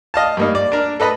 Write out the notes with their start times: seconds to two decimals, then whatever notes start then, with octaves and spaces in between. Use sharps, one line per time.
0.14 D#5 F5 A5
0.37 G2 A#3 D#4
0.55 D5
0.72 D4 A#4
1.00 A4 B4 D#5 B5